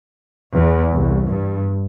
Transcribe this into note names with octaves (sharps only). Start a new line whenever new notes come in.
E2
C2
G2